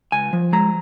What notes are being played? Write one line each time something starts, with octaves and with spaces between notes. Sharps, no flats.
C#2 G#5
F3
G#3 A#5